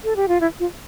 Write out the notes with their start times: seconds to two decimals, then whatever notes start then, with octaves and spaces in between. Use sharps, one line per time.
0.04 A4
0.16 G4
0.28 F4
0.41 E4
0.60 F4